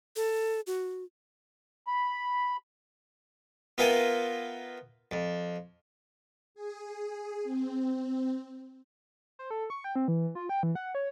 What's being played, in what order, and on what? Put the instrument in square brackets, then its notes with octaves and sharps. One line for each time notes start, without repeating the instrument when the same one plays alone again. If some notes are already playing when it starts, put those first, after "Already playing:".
[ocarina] A4
F#4
[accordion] B5
[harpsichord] B3 F4 A#4 E5 G5 G#5
F2
[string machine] G#4
C4
[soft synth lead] C5
A4
C#6
G5
C4
E3
F4
G5
E3
F#5
C#5